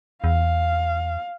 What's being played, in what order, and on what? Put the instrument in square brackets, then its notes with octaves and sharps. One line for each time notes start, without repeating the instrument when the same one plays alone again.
[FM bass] E2 [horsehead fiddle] F5